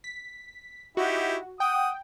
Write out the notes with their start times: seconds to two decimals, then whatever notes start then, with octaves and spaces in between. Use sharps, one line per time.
0.04 B6
0.97 D#4 E4 F#4 G4
1.60 F#5 G5 D#6